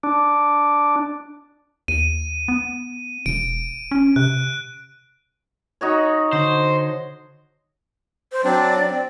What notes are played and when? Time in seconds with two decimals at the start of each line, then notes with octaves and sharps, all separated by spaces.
0.03 D4
1.88 D#2 D#7
2.48 B3
3.26 E1 D7
3.91 C#4
4.16 C3 F#6
5.81 D#4 F#4 C#5
6.33 D3 C5
8.32 C5
8.44 F#3 C4 D4 D5
8.91 C4